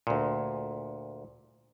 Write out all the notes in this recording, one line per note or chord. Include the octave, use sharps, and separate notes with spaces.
D2 A#2